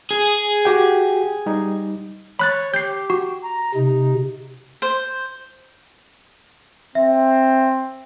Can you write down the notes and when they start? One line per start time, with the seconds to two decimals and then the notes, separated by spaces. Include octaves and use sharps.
0.11 G#4
0.65 F#4 G4 G5
1.46 G3 D#4
2.39 C#5 B5 F#6 A6
2.74 G4 G6 C7
3.10 F#4
3.43 A#5
3.75 C3 D#4
4.82 C5
6.95 C4 E5